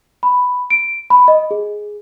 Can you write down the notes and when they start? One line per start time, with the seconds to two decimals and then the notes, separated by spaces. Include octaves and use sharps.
0.23 B5
0.70 D7
1.10 B5
1.28 D#5
1.51 G#4